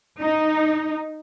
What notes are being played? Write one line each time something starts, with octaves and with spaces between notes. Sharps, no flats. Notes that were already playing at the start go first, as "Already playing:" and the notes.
D#4